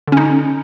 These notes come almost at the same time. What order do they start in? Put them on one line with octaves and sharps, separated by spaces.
D3 C#4 D#4